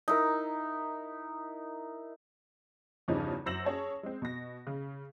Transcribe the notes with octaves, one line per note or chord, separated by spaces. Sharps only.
D#4 E4 A#4
E2 G2 C#3 F3 C#4 D#4
F#2 C5 E6 A#6 E7 F#7
C#4 G#4 C#5 A5
G#3 C4
B2 A#6
C#3